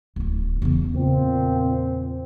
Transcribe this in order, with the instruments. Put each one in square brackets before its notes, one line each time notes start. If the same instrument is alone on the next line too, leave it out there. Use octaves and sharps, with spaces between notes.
[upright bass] D1 E4
E2 C#3
[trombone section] A#2 C4